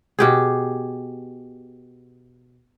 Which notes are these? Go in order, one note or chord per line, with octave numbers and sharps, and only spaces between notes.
B2 G4 G#4